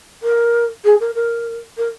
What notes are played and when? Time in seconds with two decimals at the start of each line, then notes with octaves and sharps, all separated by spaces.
0.23 A#4
0.84 G#4
1.00 A#4
1.15 A#4
1.78 A#4